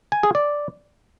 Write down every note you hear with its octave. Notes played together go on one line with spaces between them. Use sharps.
G#5
G#4
D5